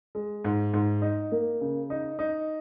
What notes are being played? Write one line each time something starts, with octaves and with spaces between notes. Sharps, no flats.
G#3
G#2
G#2
D#4
A#3
C#3
D#4
D#4